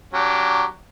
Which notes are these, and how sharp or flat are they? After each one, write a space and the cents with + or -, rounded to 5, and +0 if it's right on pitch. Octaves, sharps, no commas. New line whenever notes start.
F#3 +0 D4 -35 G4 +0